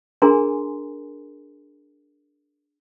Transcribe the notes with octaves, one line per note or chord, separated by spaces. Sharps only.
D4 G#4 A#4 G#5 A#5 C6